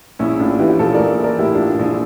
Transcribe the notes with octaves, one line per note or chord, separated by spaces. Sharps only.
A#1 C#4 E4
A2 D4 F4
E3 E4 G4
G4
A#1 F4 A4
A#1 A#4 D5
E3
A#4 D5
A2 E4 G4
A2 D4 F4
D4
A#1 D4